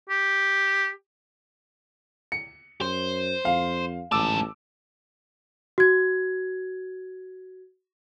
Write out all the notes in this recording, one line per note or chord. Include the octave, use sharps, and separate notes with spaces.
G4
C#7
F#2 C5
F2 F5
A1 G#2 A5 D6 E6
F#4 G#6